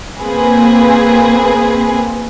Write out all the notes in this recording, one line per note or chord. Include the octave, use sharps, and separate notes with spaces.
A#3 C4 G#4 B4